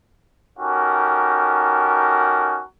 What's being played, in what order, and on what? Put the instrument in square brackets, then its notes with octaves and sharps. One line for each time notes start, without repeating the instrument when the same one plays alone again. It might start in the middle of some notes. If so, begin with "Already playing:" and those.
[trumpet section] C#4 D#4 F#4 G4 A4 A#4